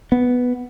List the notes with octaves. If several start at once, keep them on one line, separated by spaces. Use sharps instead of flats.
B3